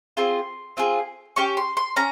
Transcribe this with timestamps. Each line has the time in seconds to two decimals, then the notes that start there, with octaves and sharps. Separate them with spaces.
0.17 C4 F4 G#4 C6
0.77 C4 F4 G#4
1.36 C#4 G4 C#6
1.57 C6
1.77 C6
1.96 C#4 A#5